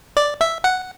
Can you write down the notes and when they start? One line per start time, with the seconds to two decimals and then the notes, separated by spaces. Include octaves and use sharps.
0.17 D5
0.41 E5
0.64 F#5